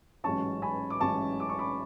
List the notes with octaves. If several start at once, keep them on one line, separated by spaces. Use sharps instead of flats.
A1 G#2 F#3 C#4 A5 C#6
G#5 B5
D6
A1 G#2 F#3 C#4 A5 C#6
D6
C#6
B5 D6